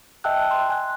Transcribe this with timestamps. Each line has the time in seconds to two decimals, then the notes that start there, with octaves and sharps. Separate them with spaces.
0.24 D#5 E5 G5 A5 E6 F#6
0.51 C6
0.69 G#5 F#6